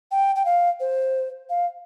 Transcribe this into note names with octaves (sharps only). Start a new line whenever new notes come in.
G5
G5
F5
C5
F5